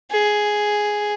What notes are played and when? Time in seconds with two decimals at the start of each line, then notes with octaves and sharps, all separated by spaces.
0.11 G#4